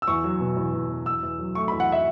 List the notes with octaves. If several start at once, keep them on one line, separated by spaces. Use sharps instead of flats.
E6
E2 C#6
F#3
B2
E2
E2
E2
E2 E6
E2
F#3
A3 C#6
B5
E2
F#5
E5